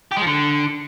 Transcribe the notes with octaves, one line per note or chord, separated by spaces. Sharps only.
G4
G#3
F3
D3